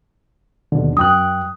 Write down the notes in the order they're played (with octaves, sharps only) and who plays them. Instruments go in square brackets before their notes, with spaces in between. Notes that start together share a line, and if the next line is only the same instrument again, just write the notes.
[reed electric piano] D#2 B2 D3
[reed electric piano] F#2 G5 F#6 [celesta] D#6